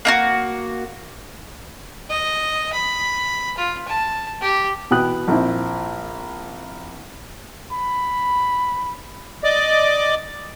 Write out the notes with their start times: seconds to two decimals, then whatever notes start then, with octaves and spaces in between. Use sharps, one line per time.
0.05 A#3 D#4 F#4
2.10 D#5
2.73 B5
3.58 F4
3.88 A5
4.41 G4
4.91 B2 E3 G5 B5 D#6 F#6
5.28 A#1 C4 E4
7.72 B5
9.44 D5 D#5 D6